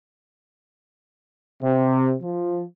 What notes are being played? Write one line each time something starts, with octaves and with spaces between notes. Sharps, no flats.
C3
F3